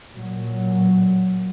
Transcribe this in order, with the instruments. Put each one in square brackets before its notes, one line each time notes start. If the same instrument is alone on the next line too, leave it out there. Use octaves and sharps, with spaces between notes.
[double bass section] A#2 F#3